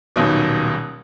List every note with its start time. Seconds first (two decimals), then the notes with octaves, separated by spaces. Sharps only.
0.16 D#1 B1 B2